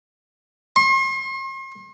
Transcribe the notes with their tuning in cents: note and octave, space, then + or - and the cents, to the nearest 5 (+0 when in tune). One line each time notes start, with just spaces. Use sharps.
C6 +45